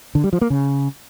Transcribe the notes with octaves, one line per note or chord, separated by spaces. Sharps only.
D3
G3
F3
A#3
C#3